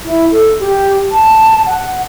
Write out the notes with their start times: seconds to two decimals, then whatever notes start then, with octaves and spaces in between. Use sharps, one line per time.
0.05 E4
0.31 A4
0.59 G4
1.11 A5
1.67 F#5